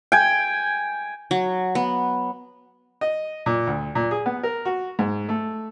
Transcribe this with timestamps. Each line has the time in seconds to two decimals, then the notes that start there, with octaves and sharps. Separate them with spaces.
0.12 G5 G#5
1.31 F#3
1.75 B3
3.01 D#5
3.46 A#2
3.67 D2
3.95 A#2
4.11 G#4
4.26 B3
4.43 A#4
4.65 F#4
4.99 G#2
5.29 A3